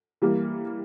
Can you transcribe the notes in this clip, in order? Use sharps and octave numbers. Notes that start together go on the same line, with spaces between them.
E3 G3 A#3